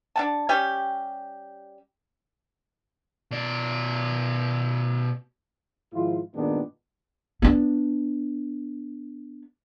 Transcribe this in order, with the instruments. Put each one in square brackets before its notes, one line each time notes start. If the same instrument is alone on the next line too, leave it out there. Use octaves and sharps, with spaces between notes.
[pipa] D4 F#5 A5
G3 C#4 G4
[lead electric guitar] B2 D5
[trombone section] G#2 D#3 F3 E4 F4
G2 A#2 D#3 G#3 B3 D4
[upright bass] B3 D4